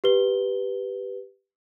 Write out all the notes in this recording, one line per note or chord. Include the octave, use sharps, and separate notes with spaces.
G4 B4 G7